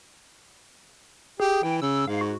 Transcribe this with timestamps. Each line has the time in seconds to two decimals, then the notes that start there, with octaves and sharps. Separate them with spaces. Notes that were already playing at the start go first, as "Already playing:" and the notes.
1.40 G4 G#4
1.63 E3 G5
1.82 C#3 E6
2.08 G#2 F5
2.21 F#4